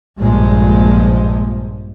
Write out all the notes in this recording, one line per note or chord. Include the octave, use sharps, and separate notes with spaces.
A#1 G2 A#2 F3 G#3